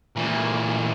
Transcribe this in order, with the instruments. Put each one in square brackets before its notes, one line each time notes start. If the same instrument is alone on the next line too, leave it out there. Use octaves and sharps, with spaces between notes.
[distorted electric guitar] A#2 E3